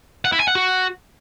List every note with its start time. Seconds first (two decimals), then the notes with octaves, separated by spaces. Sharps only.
0.25 F#5
0.32 E4
0.40 G#5
0.48 F#5
0.55 F#4